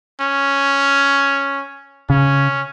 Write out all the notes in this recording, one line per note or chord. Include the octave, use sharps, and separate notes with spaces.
C#4
C#3 C#4